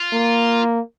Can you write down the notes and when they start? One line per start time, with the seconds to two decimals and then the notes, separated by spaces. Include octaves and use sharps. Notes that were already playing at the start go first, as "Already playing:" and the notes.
Already playing: F4
0.13 A#3